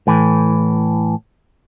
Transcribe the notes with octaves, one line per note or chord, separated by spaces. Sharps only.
A2 E3